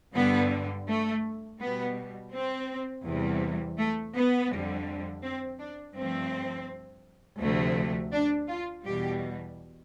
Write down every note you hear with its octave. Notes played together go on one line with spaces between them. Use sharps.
G2 D3 G3 B3
A3
B2 G3 B3
C4
E2 C3 G3
A3
B3
F2 D3 G3
C4
D4
G2 F3 A3 C4
D2 C3 F3 A3
D4
F4
E2 B2 G3 G4